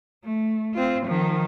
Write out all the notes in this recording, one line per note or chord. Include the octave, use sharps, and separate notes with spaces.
A3
C4 F4
D#3 F3